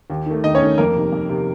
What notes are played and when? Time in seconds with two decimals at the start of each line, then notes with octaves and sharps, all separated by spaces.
0.10 D#2
0.26 D#3 A3
0.44 D#2 D#4 D#5
0.55 C#4 C#5
0.62 D#3 A3
0.78 F2 A#3 A#4
0.95 C3 D#3
1.13 F2
1.29 C3 D#3